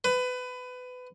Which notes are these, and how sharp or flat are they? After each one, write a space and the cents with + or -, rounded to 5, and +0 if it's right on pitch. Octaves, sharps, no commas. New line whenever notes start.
B4 +25